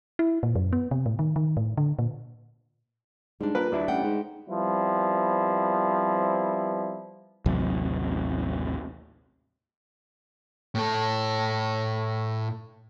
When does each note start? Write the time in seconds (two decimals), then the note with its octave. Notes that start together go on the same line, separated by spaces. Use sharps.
0.19 E4
0.43 A#2
0.56 F#2
0.73 B3
0.91 C3
1.06 A2
1.19 D#3
1.36 D#3
1.57 A2
1.77 D3
1.99 A#2
3.41 G#2 G3 D4
3.55 A#2 A#4 B4
3.72 D#2 G3 D4 E4
3.88 A1 F#5 G5
4.04 G#2
4.48 F3 G3 B3 C4 E4
7.46 A1 D#2 C3 F#3
10.75 A2 A4